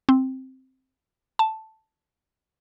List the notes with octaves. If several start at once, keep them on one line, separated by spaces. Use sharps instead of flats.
C4
A5